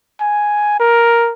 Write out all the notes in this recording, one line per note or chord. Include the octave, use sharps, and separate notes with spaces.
G#5
A#4